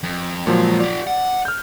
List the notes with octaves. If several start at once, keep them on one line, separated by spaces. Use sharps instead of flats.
F2
A#2 F3 F#3 G#3 C#5
F4 G4 D5
F#5
F6 G6